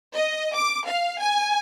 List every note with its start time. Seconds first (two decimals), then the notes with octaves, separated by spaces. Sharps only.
0.15 D#5
0.56 D6
0.87 F5
1.21 G#5